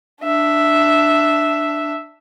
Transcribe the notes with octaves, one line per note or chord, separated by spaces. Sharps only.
D4 E5